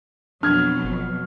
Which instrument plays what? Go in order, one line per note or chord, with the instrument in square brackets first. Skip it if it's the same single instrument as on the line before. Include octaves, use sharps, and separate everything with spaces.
[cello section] F2 B2 F#3 [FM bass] D4 [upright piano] F6 G#6
[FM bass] G1